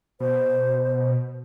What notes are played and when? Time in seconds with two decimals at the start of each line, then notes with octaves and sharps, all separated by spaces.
0.20 B2 C5